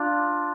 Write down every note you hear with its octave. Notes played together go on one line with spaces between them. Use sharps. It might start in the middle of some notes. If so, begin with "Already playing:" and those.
Already playing: D4 F4